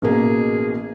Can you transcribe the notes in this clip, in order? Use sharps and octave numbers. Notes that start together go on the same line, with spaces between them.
A1 B2 A#3 G#4